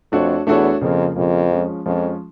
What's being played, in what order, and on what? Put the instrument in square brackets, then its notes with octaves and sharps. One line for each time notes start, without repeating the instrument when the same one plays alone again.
[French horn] F2 [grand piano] A3 D4 F#4 A4 C#5
[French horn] E2 [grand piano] A3 D4 F#4 A4 C#5
[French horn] F2 [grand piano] C#3 F3 A#3
[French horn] F2 [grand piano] C#3 F3 A#3
[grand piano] F3 G#3 C#4
[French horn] F2 [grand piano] F3 G#3 C#4